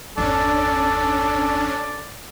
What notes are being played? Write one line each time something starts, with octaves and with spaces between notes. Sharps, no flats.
G1 E2 C#4 D4 A4 D5